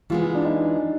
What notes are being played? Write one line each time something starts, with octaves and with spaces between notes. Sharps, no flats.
E3 G#3 B3 F4
D4
D#4